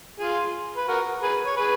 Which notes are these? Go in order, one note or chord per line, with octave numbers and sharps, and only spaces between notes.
F4 G#4
B4
F#4 A#4
G#4 B4
C#5
G#4 B4